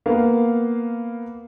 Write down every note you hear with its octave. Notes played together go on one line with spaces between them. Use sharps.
A#3 B3 F5